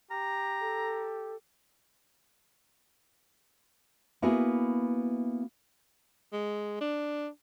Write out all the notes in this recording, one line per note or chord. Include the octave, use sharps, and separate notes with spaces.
G4 A#5
A4
A#3 B3 E4 F#4 G#4
G#3
D4